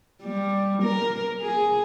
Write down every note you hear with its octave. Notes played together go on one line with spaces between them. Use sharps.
G3
A#4
G#4